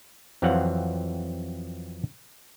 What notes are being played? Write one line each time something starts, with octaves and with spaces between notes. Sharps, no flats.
F2 E3 F#3 C4 F5 F#5